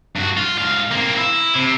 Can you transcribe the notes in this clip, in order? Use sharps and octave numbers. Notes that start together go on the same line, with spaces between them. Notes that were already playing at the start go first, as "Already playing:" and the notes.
G2 F#4
F4
G#2 F5
A#3 C4
E4
C3